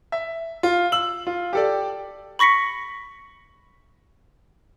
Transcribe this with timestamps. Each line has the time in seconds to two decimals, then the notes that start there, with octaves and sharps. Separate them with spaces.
0.12 E5
0.63 F4
0.92 E6 F#7
1.27 F4
1.53 G4 A4 D5
2.39 B5 C#6 A#6 B6 C#7